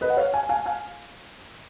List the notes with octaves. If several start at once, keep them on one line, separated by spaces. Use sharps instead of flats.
B4 D#5
F#5
C#5 F5
F5 G#5
F5 G#5
F5 G#5